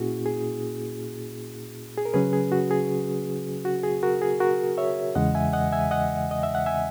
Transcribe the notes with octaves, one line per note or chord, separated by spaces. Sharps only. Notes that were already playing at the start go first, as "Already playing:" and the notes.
Already playing: A#2 A#3 C#4 E4 F#4 G#4
G#4
G#4
A#4
C#3 F#3 C#4 G#4 B4
G#4
F#4
G#4
F#4
G#4
F#4 A#4
G#4
F#4 A#4
C#5 E5
E2 C#3 E3 G#3 D#5 F#5
E5 G#5
D#5 F#5
E5 G#5
D#5 F#5
D#5
E5
F#5
E5 G#5